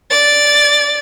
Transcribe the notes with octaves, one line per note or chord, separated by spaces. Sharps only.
D5 A6